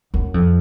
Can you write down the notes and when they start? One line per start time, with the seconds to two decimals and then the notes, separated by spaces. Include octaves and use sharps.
0.14 F#2
0.34 F2